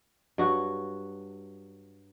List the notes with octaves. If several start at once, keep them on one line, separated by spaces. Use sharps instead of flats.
G2 F#3 F#4